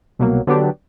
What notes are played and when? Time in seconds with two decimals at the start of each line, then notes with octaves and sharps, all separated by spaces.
0.19 C2 B2 F#3 A#3
0.47 D3 F#3 B3 D4 G4